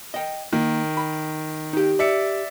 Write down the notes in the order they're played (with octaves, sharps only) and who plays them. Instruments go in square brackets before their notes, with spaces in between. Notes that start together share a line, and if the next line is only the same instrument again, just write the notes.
[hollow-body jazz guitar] D#5 G5
[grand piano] D#3 [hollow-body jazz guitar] A#3
[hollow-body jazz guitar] B5
D#4 G4
[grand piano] D5 E5 C#7